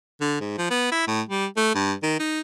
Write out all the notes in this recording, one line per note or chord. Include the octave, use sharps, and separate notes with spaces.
D3
G#2
F3
B3
E4
A2
G3
A3
G2
D#3
D#4